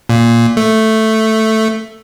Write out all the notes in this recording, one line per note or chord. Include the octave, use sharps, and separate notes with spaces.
A#2
A3